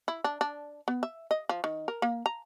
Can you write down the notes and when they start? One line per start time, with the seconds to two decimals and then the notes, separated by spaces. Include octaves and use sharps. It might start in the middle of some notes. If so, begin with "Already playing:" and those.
0.08 E4
0.24 D4
0.41 D4
0.88 B3
1.03 E5
1.31 D#5
1.49 F3
1.64 D#3
1.88 A#4
2.02 A#3
2.26 A#5